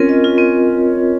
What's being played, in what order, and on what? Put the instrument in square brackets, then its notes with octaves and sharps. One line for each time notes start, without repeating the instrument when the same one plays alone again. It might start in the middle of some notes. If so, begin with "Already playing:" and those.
Already playing: [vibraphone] C4 F4 A#4 [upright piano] C#4
[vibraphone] D#5
F4
C4